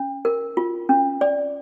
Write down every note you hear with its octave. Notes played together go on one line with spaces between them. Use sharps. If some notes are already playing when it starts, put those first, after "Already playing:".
Already playing: C#4
A#4
F4
C#4
D5